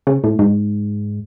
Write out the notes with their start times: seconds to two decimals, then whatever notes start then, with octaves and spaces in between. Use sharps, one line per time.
0.07 C#3
0.24 A2
0.39 G#2